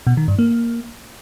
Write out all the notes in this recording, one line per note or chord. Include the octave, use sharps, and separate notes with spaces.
B2
D#3
G2
A#3